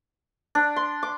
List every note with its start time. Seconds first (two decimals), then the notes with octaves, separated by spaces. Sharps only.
0.55 D4
0.76 C6
1.03 D6